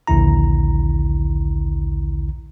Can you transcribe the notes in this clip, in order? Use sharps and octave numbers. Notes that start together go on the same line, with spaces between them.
A#1 D#2 D3 E4 A#5